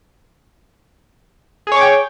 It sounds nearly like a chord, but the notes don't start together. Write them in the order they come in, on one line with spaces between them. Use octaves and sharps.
G#4 C#5 D6 G5